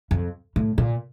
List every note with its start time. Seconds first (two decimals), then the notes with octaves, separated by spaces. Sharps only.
0.11 F2
0.56 A2
0.78 A#2